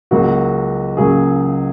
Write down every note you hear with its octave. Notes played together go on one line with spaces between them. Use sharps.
C#2 C#3 F#3 A#3 F#4
C#2 C#3 F#3 A#3 G#4